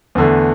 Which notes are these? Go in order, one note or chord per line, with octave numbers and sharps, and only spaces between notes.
E2 D3 A3